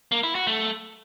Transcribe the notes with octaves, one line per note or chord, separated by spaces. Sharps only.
A#3
E4
F#4
A3